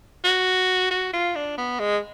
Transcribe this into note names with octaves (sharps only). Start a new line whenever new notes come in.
F#4
F#4
F4
D4
B3
G#3